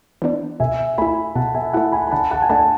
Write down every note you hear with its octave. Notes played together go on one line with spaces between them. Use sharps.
E3 B3 D4
B2 E5 G#5
A3 E4 G#5 B5
B2 F#5 A5
E5 G#5
A3 E4 F#5 A5
G#5 B5
B5
D3 F#5 A5
F#5 A5
G#5
A3 D4 F#5 A5